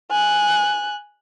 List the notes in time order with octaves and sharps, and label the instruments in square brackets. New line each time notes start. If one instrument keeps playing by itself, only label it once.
[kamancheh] G#5 F#6